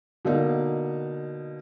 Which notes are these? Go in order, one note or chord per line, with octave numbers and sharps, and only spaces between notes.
B2 D3 A#3 D#4